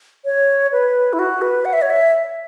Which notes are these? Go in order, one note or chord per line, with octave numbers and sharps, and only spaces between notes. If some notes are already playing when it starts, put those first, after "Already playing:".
C#5
B4
E4
F#4
B4
F#5
E5
C#5
E5